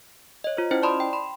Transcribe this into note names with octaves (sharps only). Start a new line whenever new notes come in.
C#5 D#5
F4 C5
C#4 E4 C5 D#5 G5
D5 A5 B5 C6 D#6
G5
B5 C6